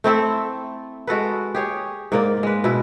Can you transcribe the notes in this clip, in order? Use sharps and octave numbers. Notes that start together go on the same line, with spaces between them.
A3 C4 E4 A4
G#3 F#4 A4 B4
G4 G#4 C#5
G#2 A#3 D5
G#3 B4
B2 E4